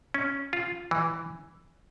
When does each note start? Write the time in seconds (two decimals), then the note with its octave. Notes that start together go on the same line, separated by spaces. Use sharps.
0.14 C#4
0.53 F4
0.91 E3